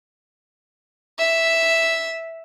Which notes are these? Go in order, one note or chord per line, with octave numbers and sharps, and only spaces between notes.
E5